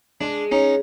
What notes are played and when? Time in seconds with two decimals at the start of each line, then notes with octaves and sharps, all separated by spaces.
0.21 G#3 D4
0.52 C#4 D#4